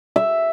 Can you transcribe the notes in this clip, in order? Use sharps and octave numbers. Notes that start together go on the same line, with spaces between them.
E5